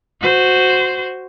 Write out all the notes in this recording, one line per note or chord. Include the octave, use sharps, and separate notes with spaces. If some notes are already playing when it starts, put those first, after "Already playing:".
F#4 C5